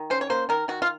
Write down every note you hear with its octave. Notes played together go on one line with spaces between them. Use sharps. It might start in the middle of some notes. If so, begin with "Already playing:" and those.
Already playing: D#3
C#4 C5
C#5
A#3 C5
D#3 A#4
D#3 F#4
F4